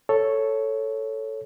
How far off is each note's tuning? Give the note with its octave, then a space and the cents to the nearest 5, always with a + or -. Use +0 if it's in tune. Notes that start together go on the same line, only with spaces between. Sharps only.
A4 +0 C#5 +0